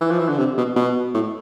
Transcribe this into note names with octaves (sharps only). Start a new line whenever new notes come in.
E3
F3
E3
D3
C3
B2
B2
A2